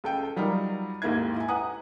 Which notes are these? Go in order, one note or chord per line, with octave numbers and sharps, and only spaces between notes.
C#2 A4 G5
F#3 G3 D#4 F4 A#4
D#2 G#2 A#3 E4 G#6
E4 G#5
B4 F#5 A#5 D#6